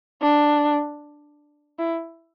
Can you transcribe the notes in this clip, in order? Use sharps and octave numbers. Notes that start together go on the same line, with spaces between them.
D4
E4